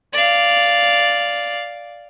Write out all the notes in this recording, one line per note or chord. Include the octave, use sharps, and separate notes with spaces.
D5 F5